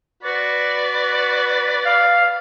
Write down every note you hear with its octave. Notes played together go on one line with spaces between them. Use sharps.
F#4 B4 D5
F5